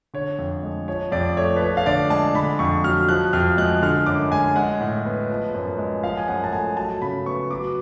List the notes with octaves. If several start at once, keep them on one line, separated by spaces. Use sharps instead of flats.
D3 C#5
F2
G#3
F3 C#5
F2 D5
A3 C#5
B4
F3 C#5
F5
D3 D5
G#3 A5
D3 B5
F2 C#6
F#3 F6
F3 F#6
F2 F6
G#3 F#6
D3 F6
F#2 D6
G#3 G#5
G#3 F#5
A2
B3
F3
F#2
G#3
F3 F5
G#5
F#2 F#5
A5
A3 G#5
F#3 A5
C#3 B5
B3 C#6
F#3 D6